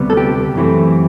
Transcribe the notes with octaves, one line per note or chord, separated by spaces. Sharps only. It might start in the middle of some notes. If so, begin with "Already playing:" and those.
Already playing: D2 C3 G3 B3
A4
G4
F#2 E3 A3 C4